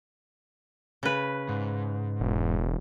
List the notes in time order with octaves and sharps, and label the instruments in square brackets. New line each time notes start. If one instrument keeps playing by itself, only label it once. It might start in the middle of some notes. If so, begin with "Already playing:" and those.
[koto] C#3 B4
[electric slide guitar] G#2
[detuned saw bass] E1